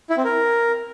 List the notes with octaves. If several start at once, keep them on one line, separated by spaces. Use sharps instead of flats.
E4
C4
A#4